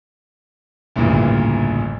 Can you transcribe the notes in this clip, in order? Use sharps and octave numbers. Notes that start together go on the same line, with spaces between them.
A1 D2 G2 A#2 C#3 E3